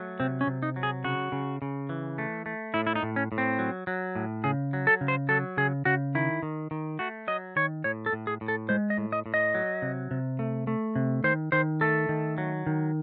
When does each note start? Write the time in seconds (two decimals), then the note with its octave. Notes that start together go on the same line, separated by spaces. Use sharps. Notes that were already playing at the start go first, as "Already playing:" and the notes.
Already playing: F#3 A3
0.20 C3 C4
0.41 C#4
0.47 C3
0.63 D#4
0.76 F#3
0.83 G#4
1.04 C#3 F#4
1.32 C#3
1.62 C#3
1.89 E3
2.18 A3
2.46 A3
2.74 A2 E4
2.87 E4
2.96 D#4
3.03 A2
3.16 C#4
3.32 A2
3.38 C4
3.59 F#3
3.87 F#3
4.15 A2
4.44 C#3 G#4
4.73 F#3
4.87 A4
5.01 C#3
5.08 C5
5.29 F#3 A4
5.57 C#3 G#4
5.85 C#3 F#4
6.15 D#3 E4
6.43 D#3
6.71 D#3
6.99 A3 F#4
7.28 F#3 D#5
7.56 D#3 C#5
7.84 A2 C#5
8.06 A4
8.13 A2
8.27 G#4
8.41 A2
8.48 A4
8.69 G#3 C5
8.90 D#5
8.98 A2
9.12 D#5
9.26 A2
9.34 D#5
9.54 F#3
9.82 C3
10.11 C3
10.39 A3
10.67 A3
10.96 C3
11.24 D#3 C5
11.52 D#3 C5
11.81 A3 A4
12.09 D#3
12.38 F#3
12.67 D#3